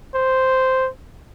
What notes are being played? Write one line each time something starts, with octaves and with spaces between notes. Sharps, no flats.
C5